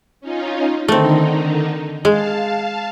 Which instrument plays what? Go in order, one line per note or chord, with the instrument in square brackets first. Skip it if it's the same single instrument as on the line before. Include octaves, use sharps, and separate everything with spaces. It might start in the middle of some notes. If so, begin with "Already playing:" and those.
[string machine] C#4 D#4 F4
[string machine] D3 D#3 D#4 [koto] A3 C4
[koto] G#3 [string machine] F5 A5